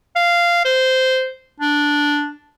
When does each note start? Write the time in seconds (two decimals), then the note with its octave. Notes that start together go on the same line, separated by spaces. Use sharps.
0.16 F5
0.65 C5
1.60 D4